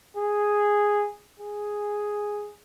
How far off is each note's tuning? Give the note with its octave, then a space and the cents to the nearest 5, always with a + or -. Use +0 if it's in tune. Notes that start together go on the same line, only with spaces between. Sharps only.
G#4 -5
G#4 +0